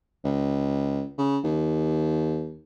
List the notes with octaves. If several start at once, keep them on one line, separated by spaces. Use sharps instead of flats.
C#2
C#3
D#2